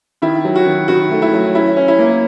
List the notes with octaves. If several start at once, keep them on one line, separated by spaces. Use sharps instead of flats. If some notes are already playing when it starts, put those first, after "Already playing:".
D#3 E4
F#3
F#4
D#3
D#3 F#4
A3
E4
F#3
C#4 E4
C#4
E4
A#3